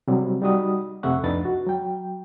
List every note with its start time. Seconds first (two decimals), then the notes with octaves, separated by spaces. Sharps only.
0.08 C3 F#3 G3
0.42 G3 D#4 F#4 D#6
1.03 F2 C3 A3 E5 F#5 C#6
1.23 C2 F2 D4 D#4 B4 A6
1.45 F#4
1.67 F#3 G5